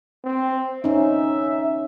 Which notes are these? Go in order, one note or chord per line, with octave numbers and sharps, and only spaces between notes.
C4
C#4 D#4 E5